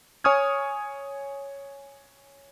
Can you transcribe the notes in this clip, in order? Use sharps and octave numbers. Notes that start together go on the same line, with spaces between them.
C#5 G#5 C#6 D#6 F6 G#6